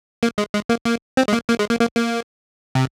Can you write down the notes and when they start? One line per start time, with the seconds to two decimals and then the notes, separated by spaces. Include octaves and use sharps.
0.23 A#3
0.38 G#3
0.54 G#3
0.69 A#3
0.85 A#3
1.17 C4
1.28 G#3
1.33 A#3
1.49 A#3
1.59 G#3
1.70 A#3
1.80 A#3
1.96 A#3
2.75 C3